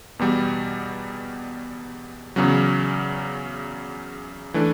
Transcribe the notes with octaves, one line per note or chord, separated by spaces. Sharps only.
E2 B2 G3
E2 C#3 F#3
E3 A3 D4